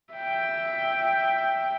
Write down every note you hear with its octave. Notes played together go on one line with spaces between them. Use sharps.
E5 G5